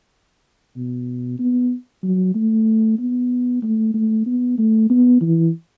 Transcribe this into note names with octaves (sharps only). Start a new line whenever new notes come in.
B2
B3
F#3
A3
B3
A3
A3
B3
A3
B3
E3